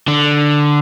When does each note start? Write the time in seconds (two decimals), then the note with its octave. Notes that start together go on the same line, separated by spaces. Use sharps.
0.08 D3